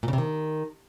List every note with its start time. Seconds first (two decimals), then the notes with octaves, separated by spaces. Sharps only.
0.03 A#2
0.08 C#3
0.13 C3
0.18 D#3